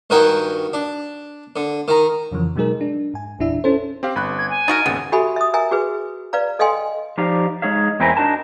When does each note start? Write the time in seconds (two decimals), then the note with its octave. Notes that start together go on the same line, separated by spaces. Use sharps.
0.10 G2 D#3 F#4 A#4 G5 G#5
0.73 D4
1.56 D3
1.88 D#3 A#5
2.31 F2 C#3 E3 F3
2.56 B2 F#3 G#3 D#4 G#4 A#4
2.81 D4
3.14 G#2 G#5
3.39 G1 E2 A#2 D4 E4 E5
3.64 C#4 E4 A4 C5
4.03 C4 G4 F5
4.16 G1 B5 F#6
4.38 G#6
4.50 G#5
4.68 D#4 F#4 A#4 A6
4.86 G#1 D#2 C#3 B3
5.12 F#4 G4 A4 E5 G#5 B5
5.36 E5 D#6
5.54 A#4 E5 G#5 A#5
5.71 F#4 G#4 B4
6.33 B4 D5 F5 A#5
6.59 A4 D#5 F5 G5 G#5 C6
7.17 F3 D#4 G4 D5 F5
7.62 G#3 D#4 G#4 C#5 F5
8.00 E2 C4 E4 A#4 G#5
8.17 D4 D#4 F#4 A#4 A5